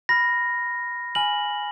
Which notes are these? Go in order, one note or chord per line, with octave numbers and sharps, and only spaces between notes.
B5 F6 A#6
G#5 B5 F6 F#7